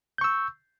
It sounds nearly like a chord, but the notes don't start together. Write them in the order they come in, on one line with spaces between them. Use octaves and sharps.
G6 C#6 E6